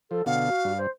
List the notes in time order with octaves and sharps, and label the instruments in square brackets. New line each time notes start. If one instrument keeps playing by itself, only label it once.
[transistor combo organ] F3 [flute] A4
[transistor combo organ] B2 D3 [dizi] F5 [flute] F#5
[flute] F#4
[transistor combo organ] G2
[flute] C5